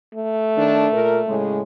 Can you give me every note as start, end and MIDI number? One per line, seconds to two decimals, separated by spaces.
0.15 1.51 57
0.57 0.85 51
0.57 0.85 62
0.93 1.19 46
0.93 1.19 70
1.27 1.61 45
1.27 1.61 49
1.27 1.61 56